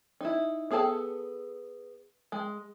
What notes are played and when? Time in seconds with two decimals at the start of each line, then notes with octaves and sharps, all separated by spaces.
0.21 D#4 E4
0.71 B3 G#4 A4 G#5 A5
2.32 G#3